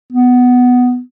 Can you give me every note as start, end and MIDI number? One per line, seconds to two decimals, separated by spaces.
0.13 1.00 59